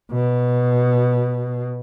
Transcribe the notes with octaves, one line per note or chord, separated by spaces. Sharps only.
B2